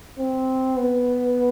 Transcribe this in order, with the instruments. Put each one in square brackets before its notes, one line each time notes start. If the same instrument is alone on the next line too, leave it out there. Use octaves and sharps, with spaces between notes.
[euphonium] C4
B3